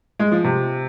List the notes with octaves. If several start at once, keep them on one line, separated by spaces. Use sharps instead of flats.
G#3
F3
C3